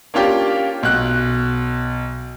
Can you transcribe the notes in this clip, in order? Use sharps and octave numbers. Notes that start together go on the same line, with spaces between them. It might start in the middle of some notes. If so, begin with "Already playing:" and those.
A#3 C#4 D4 F4 G4
B1 F#6